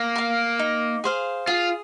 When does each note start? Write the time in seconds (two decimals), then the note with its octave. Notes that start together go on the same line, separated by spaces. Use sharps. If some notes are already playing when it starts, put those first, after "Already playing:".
Already playing: A#3
0.16 A#4 F5
0.59 D#4
1.04 G#4 C5 F5
1.47 F4 G#4